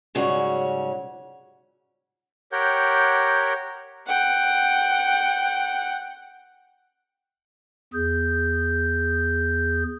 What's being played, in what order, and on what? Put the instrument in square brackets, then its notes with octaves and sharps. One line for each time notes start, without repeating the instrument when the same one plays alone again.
[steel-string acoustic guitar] G#2 C#3 F#3 G3 C#4 F#4
[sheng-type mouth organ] G4 A#4 C#5 F#5 G5 G6
[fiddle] F#5 G5
[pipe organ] E2 G#4 G6